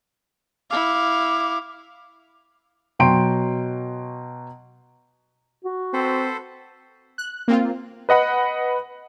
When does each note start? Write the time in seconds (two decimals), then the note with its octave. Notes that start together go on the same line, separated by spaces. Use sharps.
0.70 E4 F5 D6
2.99 B2 F#3 G5 C6 D7
5.64 F#4
5.93 C4 A4 B4 C5
7.18 F#6
7.48 A#3 C4 F4
8.09 B4 D#5 F#5 B5